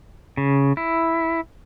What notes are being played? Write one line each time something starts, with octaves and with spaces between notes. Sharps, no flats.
C#3
E4